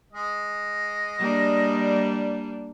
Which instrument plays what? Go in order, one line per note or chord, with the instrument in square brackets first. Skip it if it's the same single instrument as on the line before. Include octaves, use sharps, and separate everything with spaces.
[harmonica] G#3 D#5
[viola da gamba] G3 A#3 D4